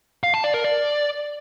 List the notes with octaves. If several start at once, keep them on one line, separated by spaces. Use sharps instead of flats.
F5
A5
D5
A#4
D5